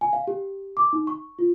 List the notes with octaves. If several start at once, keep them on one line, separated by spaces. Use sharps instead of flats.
G#5
F5
G4
D6
D#4
C#6
F4